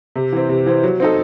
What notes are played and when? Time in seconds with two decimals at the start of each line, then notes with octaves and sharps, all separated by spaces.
0.16 C3
0.32 E3 C4
0.49 C3
0.66 E3 C4
0.83 F#3
1.00 C4 D#4 A4